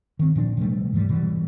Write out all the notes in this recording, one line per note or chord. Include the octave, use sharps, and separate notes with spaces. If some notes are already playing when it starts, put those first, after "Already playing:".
D#3 C4
A#2 F3 D4
C3 F3 G3 A3
G#2 E3 F#3 G3
B2 E3 G3